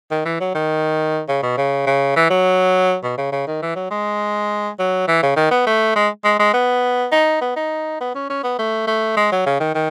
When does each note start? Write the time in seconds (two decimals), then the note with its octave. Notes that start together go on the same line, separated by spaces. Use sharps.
0.11 D#3
0.25 E3
0.40 F#3
0.55 D#3
1.28 C#3
1.43 B2
1.57 C#3
1.86 C#3
2.16 E3
2.30 F#3
3.03 B2
3.18 C#3
3.32 C#3
3.47 D#3
3.62 E3
3.76 F#3
3.91 G#3
4.79 F#3
5.08 E3
5.23 C#3
5.36 D#3
5.51 B3
5.67 A3
5.96 G#3
6.24 G#3
6.39 G#3
6.54 B3
7.12 D#4
7.42 B3
7.56 D#4
8.01 B3
8.15 C#4
8.30 C#4
8.44 B3
8.59 A3
8.87 A3
9.17 G#3
9.32 F#3
9.46 C#3
9.60 D#3
9.75 D#3